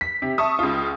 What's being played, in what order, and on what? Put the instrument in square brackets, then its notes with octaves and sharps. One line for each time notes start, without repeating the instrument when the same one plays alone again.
[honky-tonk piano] B6
C3
E5 A5 C#6 D#6
C#2 F4